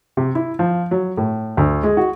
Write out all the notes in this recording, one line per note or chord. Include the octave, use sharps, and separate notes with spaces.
C3
E4
F3
F#3
A2
D2
G#3
F#4